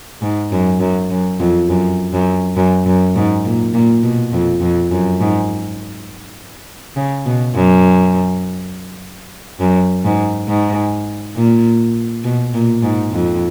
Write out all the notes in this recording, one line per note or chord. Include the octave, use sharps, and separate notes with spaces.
G#2
F#2
F#2
F#2
F2
F#2
F#2
F#2
F#2
G#2
A#2
A#2
B2
F2
F2
F#2
G#2
C#3
B2
F#2
F#2
G#2
G#2
A#2
B2
A#2
G#2
F2